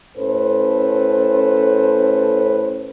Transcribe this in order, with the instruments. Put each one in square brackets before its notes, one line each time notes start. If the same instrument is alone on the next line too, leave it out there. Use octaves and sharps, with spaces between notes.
[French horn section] A2 C#4 A4 B4 C5